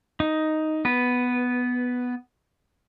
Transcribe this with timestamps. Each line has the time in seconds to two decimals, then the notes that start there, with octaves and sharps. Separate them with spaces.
0.20 D#4
0.85 B3 B4